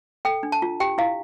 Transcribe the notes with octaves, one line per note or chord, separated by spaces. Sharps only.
A4 G5
D4
A5
F4
G4 G5
E4 F5